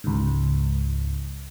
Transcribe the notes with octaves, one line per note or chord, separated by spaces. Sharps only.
C#2 G#2